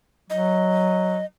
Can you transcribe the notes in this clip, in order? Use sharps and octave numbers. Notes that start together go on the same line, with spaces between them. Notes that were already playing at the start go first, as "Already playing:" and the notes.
F#3 D#5